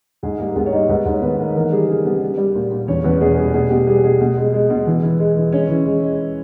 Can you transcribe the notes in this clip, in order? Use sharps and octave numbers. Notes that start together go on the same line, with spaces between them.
G#2 G#4
G3 A#3 A#4
G#2 B3 B4
C#5
G3 D#4 D#5
G#2 B3 B4
G#2
C#5
D#3 B3 B4
D#3 A#3 A#4
E3 A#3 A#4
G3 G#4
C#3 G#4
G3 B3 B4
G3
G3
A#2
A#2
E2 C#4 C#5
E2 B3 B4
B2 G#4
G3 G#4
B2 G#4
B2 G4
G3 G#4
B2 G#4
B2
G#3
G#3
B2
E3
E3
G#3
E3
G#3 C#4 C#5
E3
G#3
G#3